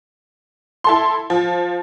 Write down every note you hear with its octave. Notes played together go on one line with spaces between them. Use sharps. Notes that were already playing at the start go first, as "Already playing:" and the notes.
E4 A4 C6
F3